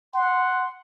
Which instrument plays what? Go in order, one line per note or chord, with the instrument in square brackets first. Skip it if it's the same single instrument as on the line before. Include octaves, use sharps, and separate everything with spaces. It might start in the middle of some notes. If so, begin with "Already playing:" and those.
[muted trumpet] F#5 [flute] C6